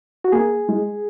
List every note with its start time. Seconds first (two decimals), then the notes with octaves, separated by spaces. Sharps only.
0.24 F#4
0.32 A#3 G#4
0.68 G#3